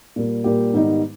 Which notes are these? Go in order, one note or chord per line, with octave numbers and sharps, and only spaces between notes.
A#2 G3 A#3
A#2 G3 A#3 G4
G#2 D#3 G3 B3 D#4